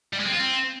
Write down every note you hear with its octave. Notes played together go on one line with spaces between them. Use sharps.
G3
G#3
C4
F4
C4